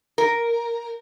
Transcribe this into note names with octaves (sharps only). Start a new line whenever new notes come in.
A#4